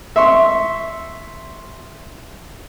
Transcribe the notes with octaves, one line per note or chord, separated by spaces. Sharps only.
E5 C6 C#6